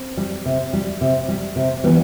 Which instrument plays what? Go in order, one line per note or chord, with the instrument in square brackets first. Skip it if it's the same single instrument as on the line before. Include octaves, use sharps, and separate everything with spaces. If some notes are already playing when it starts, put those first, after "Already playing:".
Already playing: [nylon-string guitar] C4
G3
C3
G3
C3
G3
C3
E3 G3 B3